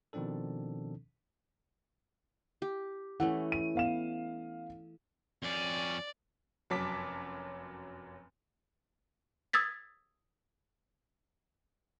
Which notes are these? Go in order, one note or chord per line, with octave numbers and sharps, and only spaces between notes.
B2 D#3 F3 C4 D4 A4
G4
E3 A3 C#4 F#5
D#7
B3 F5 E7
F2 C#4 D5
F1 F#2 F#3 A5 D6 B6
D#6 E6 G#6 A6 B6